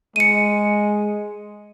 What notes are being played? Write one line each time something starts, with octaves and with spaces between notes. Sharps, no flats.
G#3 C#7 D#7